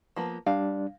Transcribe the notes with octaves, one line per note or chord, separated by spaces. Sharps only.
F3 A#3 B3
G3 D4 F5